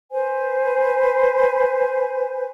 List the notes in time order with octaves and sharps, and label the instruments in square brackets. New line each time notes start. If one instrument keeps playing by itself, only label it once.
[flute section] B4 C5 G#5